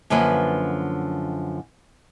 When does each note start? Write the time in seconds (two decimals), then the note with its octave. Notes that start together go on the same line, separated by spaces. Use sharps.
0.10 F#2 D3 F3 A#3 B4